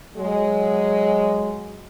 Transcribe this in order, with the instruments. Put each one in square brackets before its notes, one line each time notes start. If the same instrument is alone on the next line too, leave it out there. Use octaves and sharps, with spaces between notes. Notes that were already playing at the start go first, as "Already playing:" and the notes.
[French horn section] F#3 G#3